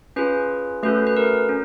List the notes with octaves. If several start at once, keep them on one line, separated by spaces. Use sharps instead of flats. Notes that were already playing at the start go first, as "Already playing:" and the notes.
C#4 F4 G#4 B4
A3 C#4 F#4 A4 B4
B4
A#4
C#4